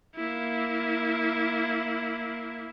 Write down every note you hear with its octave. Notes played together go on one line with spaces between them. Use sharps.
A#3 E4